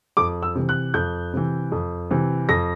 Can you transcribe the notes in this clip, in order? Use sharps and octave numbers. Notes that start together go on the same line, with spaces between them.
F2 D6
E6
C3 E3
F#6
F2 G6
C3 E3
F2
C3 E3
F2 A#6